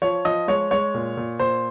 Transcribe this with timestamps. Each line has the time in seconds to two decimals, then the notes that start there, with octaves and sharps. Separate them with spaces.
0.02 F3 C#5
0.25 F3 D#5
0.48 G#3 C#5
0.71 G#3 C#5
0.94 A#2
1.17 A#2
1.40 A#2 C5